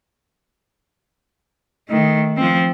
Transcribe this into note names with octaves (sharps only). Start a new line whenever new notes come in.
D#3 A3
F3 C4